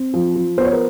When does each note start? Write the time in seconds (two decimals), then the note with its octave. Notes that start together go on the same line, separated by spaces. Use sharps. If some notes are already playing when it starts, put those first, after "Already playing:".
Already playing: C4
0.14 F3
0.36 F3
0.58 B3 C5
0.65 C#5
0.72 A#4 C5